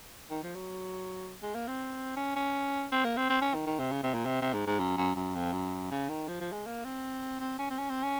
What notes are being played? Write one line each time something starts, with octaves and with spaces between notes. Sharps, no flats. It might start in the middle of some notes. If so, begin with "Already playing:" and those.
D#3
F3
F#3
G#3
A#3
C4
C#4
C#4
C4
A#3
C4
C4
C#4
D#3
D#3
C3
C#3
C3
A#2
C3
C3
G#2
G#2
F#2
F#2
F#2
F2
F#2
C#3
D#3
F3
F3
G#3
A#3
C4
C4
C#4
C4
C#4
C4
C#4